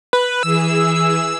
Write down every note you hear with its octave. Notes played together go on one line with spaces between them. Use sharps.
B4
E3 G#4 E6